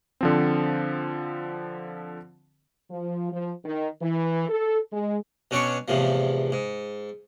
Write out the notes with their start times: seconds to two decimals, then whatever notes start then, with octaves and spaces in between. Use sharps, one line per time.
0.21 D3 F3 C4
2.91 F3
3.33 F3
3.65 D#3
4.02 E3
4.49 A4
4.93 G#3
5.51 B2 C#4 D4 C#5
5.88 E2 A2 C3 F3
6.52 G#2